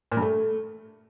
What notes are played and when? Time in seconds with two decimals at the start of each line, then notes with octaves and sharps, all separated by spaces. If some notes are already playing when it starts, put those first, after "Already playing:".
0.12 A#2
0.17 G2
0.22 A3